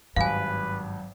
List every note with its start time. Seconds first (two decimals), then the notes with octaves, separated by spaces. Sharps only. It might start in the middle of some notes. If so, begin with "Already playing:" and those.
0.16 G#1 G2 F#3 B4 F5 G#5